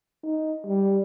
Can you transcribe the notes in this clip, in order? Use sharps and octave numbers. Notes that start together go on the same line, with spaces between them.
D#4
G3